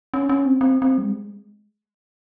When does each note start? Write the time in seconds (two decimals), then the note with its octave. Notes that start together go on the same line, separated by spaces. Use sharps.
0.14 C#4
0.29 C#4
0.45 C4
0.61 C4
0.82 C4
0.98 G3
1.02 G#3